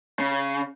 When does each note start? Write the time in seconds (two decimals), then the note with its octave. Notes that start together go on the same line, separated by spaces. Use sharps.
0.20 C#3